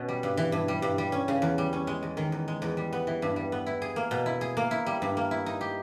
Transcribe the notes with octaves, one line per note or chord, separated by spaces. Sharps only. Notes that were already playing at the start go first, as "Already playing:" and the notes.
Already playing: B2 C#4
G3
G2
E3
G2
G3
G2
G3
C#4
C#3
E2
G3
C#4
G#3
E2
D#3
E2
G#3
E2
G3
B3
E3
G2
G3
B3
E4
G#4
A#3
B2
E4
G#4
A#3
E4
G3
G2
A#3
E4
D#4
G4